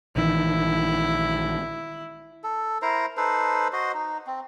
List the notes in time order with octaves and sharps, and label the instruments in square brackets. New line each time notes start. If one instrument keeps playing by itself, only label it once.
[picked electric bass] A#1 D#3 E3 [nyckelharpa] E4
[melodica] A4
E4 A#4 C5 A#5
D#4 A4 B4 C5
F#4 C5 D#5
D#4
C4